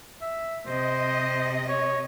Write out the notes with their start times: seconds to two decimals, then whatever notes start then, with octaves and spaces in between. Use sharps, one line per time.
0.22 E5
0.67 C3 C5 D#5
1.68 C#5